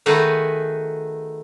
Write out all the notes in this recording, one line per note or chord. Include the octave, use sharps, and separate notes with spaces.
D#3 A3 D#4 F#4 G#4 B4